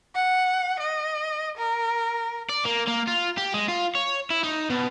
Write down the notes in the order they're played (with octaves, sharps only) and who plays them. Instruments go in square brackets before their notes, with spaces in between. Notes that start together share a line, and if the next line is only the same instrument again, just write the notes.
[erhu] F#5
D#5
A#4
[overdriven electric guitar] D5
A#3
A#3
F4
G4
G#3
F4
C#5
E4
D#4
B2